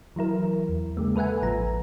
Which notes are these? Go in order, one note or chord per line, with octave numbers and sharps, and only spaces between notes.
E3 F#3 E4 A#4
E2
C#3 G#3 A#3
A4 B4 E5 F#5 G#5
A1 F3 A#5